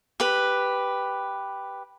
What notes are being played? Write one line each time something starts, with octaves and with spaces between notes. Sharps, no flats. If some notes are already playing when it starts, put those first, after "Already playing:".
G4 B4